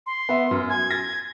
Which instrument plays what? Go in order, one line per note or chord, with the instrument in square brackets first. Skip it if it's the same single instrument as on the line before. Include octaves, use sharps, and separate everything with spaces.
[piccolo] C6
[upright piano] B3 E5
F#2
[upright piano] G#5 [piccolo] G#6
[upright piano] A6 A#6